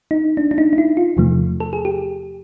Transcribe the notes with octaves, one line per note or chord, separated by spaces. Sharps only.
D#4
D4
D4
D#4
D#4
E4
F4
E2 C3 F3 A3
A4
G#4
G4